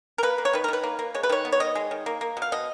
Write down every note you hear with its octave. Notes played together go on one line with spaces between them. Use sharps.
A#4
A#3 B4
A#3
C#5
D#3 B4
A#4
D#3 B4
A#3
A#3
G#3 C#5
B4
D#3 C#5
B3
C#5
D#3 D#5
G#3
D#3
A#3
A#3
B2
F5
B2 D#5